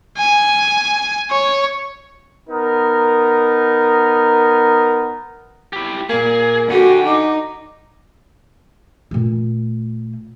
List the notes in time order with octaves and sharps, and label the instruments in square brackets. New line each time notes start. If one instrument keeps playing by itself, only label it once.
[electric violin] G#5
C#5
[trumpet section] B3 D#4 A#4
[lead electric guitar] E4 G4
[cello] A#2 [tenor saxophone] A#3 [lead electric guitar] G#4
[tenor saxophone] D3 [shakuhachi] F#4 [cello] G4 [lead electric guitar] F#5 G#5
[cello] D#4 [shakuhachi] D6
[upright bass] A#2 A3